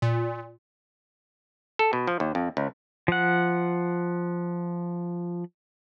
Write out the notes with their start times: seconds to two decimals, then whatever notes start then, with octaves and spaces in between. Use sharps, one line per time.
0.02 A#2
1.79 A4
1.93 B2
2.07 F3
2.20 D#2
2.35 F2
2.57 C#2
3.08 F3 F#5